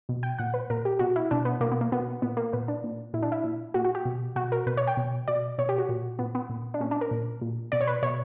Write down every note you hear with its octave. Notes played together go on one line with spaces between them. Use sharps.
B2
G5
A#2 F#5
B4
A#2 A#4
G4
B2 F#4
E4
B2 D4
B3
B2 A#3
B3
A#3
B2 B3
A#2 B3
A#3
A#2 B3
D4
A#2
A#2 E4
D4
E4
A#2
A#2 F#4
F#4
G4
B2
B2 F#4
A#4
B2 B4
C#5
G5
B2
B2 D5
B2 C#5
G4
F#4
A#2
A#2 B3
B3
A#2
D4
A#2 C#4
D4
A#4
A#2
A#2
B2 D5
C#5
B4
B2 C#5